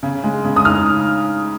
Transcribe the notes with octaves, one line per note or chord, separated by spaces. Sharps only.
C#3
G#3
C#3
D#6
D#4 F6